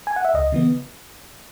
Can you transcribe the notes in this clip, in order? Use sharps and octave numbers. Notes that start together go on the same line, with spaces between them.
G#5
F#5
E5
C#2 D#5
C#3 E3 B3